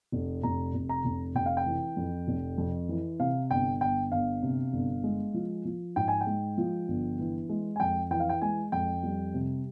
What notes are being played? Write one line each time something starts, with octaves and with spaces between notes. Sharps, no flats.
F1
F1 A#5
F1
A#5
F1
F1 G5
F5
G5
E3
F2
F1
F2
E3
C3 F5
G1 G5
G1 G5
G1 F5
C3
G1
G#3
F3
F3
G#2 G5
G#5
G5
G#3
F3
G1
E3
G#3
G#5
F2 G5
E3 G5
F5
G5
G#3 G#5
F2 G5
G3
C3